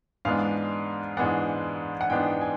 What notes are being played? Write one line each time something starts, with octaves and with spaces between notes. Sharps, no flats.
G#2 E3 G#3 B3 D4 F5
G#2 E3 G#3 B3 D4 F#5
F#5
G#2 E3 G#3 B3 D4 G5
G#5